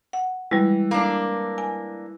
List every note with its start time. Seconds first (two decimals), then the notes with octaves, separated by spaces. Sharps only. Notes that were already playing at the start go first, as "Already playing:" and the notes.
0.13 F#5
0.51 E3 G3 G#3
0.91 A#3 D4
1.58 G#5